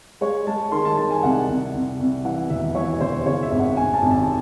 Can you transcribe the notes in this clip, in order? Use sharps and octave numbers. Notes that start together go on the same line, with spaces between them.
G#3 C#5
G#3 A5
D#3 C6
A5
G#3 A5
G#5
C2 F#5
C2
C2
C2
E3 F#5
E1 E5
E3 C#5
E1 C5
C#3 C#5
E5
G#1
F#5
G#1 G#5
A5
G#1
A5